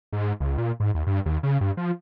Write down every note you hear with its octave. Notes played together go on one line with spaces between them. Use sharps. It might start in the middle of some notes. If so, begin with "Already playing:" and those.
G#2
C#2
A#2
G#2
D#2
G2
D#2
C#3
G2
F3